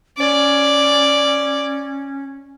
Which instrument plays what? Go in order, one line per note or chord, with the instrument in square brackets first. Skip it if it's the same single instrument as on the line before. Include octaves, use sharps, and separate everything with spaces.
[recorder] C#4 [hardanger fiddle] D5